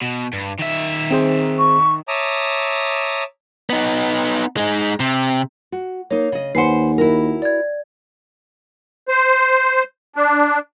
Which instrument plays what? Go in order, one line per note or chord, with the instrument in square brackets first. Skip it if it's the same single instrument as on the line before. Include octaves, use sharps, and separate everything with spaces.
[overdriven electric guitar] B2
G2
D#3 E5
[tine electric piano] C4 G#4 C5
[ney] C#6
[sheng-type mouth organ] C#5 E5 A5 A#5 D6 D#6
[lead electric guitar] B3 D#4
G#3 D#4
C3
[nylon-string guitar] F#4
[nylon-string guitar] A#3 D#4 [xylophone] C#5
[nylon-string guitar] C#3 D#5
[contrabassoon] D#2 [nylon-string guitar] B4 C5 [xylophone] F#5 G#5 C7
[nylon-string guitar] E4 F#4 A#4
[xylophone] D5 G#6
[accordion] C5
D4